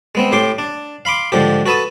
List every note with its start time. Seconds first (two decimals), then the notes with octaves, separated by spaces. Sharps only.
0.15 G#3 B3 C4
0.32 A2 G4 C6 D6
0.58 D4
1.05 F5 B5 C6 D6
1.32 G#2 D3 F3 G4
1.66 F#4 A4 B4 A5 D#6